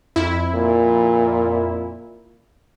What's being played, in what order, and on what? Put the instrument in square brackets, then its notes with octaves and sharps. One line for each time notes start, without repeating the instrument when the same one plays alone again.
[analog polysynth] F2 E4
[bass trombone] A#2